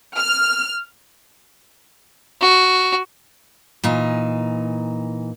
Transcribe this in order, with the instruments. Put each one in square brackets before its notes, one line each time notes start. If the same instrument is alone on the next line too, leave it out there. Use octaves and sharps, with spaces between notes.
[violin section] F6
[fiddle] F#4
[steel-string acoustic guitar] A#2 E3 D#4